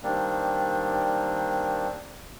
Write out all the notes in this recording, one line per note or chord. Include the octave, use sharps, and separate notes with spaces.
D#3 G3 A#3 C4 D4